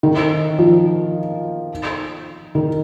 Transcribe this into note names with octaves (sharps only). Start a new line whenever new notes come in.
D#3
F3
D#3